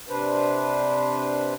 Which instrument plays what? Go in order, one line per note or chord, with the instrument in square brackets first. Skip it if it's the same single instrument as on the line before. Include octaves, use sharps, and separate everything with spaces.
[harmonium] C3 D4 B4 C5